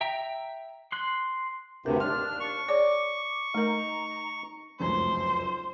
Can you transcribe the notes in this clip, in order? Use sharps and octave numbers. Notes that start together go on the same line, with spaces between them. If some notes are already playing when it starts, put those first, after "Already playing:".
E5 G5 A#5
C6 F#6
D2 G2 C3 A#4
D#2 D4 C6 F6
C#6
G#4 C#5 D5 D6
A3 D#4 A#4 A#5
F1 C#2 F#2 C5